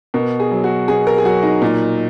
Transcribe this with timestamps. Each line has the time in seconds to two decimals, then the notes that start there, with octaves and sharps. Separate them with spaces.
0.14 B2 A#4
0.40 G#4
0.51 F#3
0.64 F#4
0.88 B2 G#4
1.07 A#4
1.18 G#4
1.24 F#3 F#4
1.43 D#4
1.62 A#2